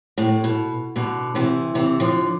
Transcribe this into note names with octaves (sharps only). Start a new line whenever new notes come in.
A2
B2
B2 D3
C3 E3
C3 E3
D3 F3